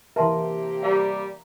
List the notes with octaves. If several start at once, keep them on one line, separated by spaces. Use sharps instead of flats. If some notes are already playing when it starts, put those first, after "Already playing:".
C3 E3 A#3 G4 A#4 E5 A5 C6
G3 F5 A#5